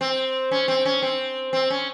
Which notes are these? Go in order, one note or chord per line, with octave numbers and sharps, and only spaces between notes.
C4
C#4
C4
C#4
C4
C4
C#4